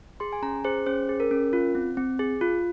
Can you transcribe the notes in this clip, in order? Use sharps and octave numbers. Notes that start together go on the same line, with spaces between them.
G#4 C6
G#5
C#4 A#5
G#4 C5
C#4 C5
G#4
A#4
C#4
F4
C4
C4
G#4
F4